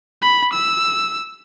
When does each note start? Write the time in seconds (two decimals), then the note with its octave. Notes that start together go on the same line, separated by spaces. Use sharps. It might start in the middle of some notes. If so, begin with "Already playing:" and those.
0.22 B5
0.54 E6